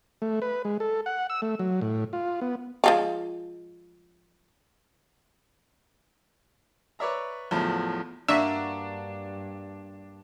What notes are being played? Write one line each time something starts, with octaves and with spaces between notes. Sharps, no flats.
A3
B4
G#3
A4
F#5
E6
A3
F#3
A2
F4
B3
F3 G#3 F4
B4 C#5 D5 E5 A#5
E2 A2 F3 F#3
G2 A#3 D4 F#4 E5